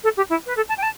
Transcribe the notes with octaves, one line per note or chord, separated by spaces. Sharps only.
A4
G4
E4
B4
A4
A5
G5
A5